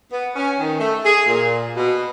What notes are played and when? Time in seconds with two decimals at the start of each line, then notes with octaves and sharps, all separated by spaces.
0.11 B3
0.35 C#4
0.58 D#3
0.79 A3
1.03 G#4
1.25 A#2
1.75 B2